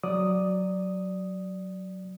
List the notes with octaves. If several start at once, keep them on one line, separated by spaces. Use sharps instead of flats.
F#3 D5 D#6